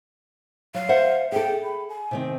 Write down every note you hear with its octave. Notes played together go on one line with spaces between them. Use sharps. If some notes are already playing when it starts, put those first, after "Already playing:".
F#3 F5
C5 E5 F#5
G#4 A4 G5
B5
G#5
C3 D#3 C4